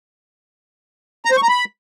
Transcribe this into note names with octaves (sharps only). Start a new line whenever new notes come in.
A#5
C5
C#6
A#5
B5